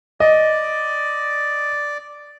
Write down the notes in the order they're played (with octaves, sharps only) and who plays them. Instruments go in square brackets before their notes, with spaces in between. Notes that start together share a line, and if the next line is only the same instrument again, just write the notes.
[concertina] D5 [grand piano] D#5